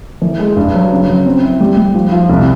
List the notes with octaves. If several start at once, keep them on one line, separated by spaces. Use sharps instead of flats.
E3
G#3
G2
F#3
C#3
F#3
C4
E4
G3
G3
F3
F3
C2